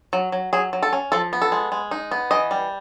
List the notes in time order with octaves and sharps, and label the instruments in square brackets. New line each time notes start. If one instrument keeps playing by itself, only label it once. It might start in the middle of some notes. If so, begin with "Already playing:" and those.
[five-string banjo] F#3
F#3
F#3 G#4
F#3
A4
C#4
F3 A4
B3
A4
G#3
G#3
D#4
B3
E3 D#5
G3